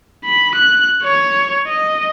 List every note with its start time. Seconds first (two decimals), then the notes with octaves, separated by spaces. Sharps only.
0.25 B5
0.55 F#6
1.03 C#5
1.67 D#5